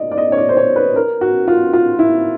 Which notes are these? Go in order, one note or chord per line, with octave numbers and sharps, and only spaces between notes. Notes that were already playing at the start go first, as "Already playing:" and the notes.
Already playing: D5 D#5
D5
D#5
C#5
D5
C5
C#5
B4
A#4
F#4
F4
F4
E4